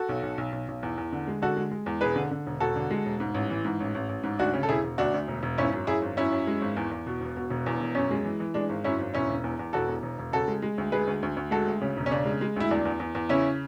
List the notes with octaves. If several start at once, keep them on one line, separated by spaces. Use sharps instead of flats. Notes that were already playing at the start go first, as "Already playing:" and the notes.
Already playing: F#4 A4
B1
B1
B1
B1
B1
E2
E2
D3
G#3
D3 F#4 A4
G#3
G#3
E2
E1 G#4 B4
D3
D3
E1
E1 F#4 A4
D3
G#3
E1
G#2
A1
E3
G#2
A1
A1
A1
G#2
D2 D4 F#4
C#3
A4
E1 E4 G#4
E1
D2 D4 F#4
D2
E1
E1
G#1 C#4 E4
F#2
F#2 E4 G#4
G#1
F#2 C#4 E4
F#2
G#3
G#1
E2
E2
B2
E1
B2
E1
E2
E1
F#2 C#4
G#3
E3
E3
G#3 D4
G#1
F#2 C#4 E4
G#1
E1 C#4 E4
E1
E2
E2
E1 F#4 A4
E2
E1
E1
C#3 F#4 A4
G#3
G#3
D2
G#3 G#4 B4
D2
D2
D2
G#3 F#4 A4
D2
C#3
E1
C#4
C#3 D4
G#3
G#3
D2 E4
E2 D4
E2
E2
E2
C#3 C#4 E4